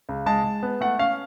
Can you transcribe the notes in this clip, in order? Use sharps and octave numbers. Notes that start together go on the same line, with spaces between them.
C#2
G#3 A5
G#3
B3
A3 F#5
C#4 F5